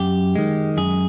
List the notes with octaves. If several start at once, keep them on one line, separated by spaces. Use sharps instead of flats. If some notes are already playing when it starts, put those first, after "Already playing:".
Already playing: F#2 G4
D#3 G#3
F#2 G#4